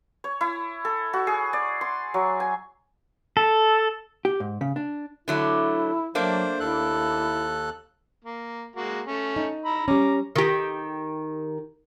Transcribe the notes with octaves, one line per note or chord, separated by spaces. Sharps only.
C#5
E4
A4
F#4
G#4
D5
C6
F#3
G#5
A4
G4
G#2
C#3
D4
D3 F#3 A3 E4
F#3 A3 A#3 D4 C5
D#2 E4 A4 F#6
A#3
G#3 A#3 F#4
A3 C#4
D#4
A#5 B5 E6
G3 C#4 A#5 D6
D#3 G4